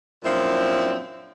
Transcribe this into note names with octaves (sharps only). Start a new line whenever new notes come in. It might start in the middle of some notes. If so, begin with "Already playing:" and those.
F#2 A#2 F3 C4 D4 E4